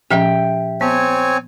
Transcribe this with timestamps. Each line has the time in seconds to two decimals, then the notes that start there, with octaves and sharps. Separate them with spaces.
0.10 A#2 F3 C#4 G4 E5 G5
0.81 B3 C4 C#5 G#5